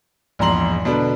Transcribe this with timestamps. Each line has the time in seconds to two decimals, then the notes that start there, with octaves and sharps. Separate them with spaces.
0.39 A#1 E2 G#2 A#5 C6 F#7
0.85 B2 D3 D4 B4